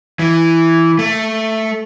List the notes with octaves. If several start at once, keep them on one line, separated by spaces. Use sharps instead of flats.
E3
A3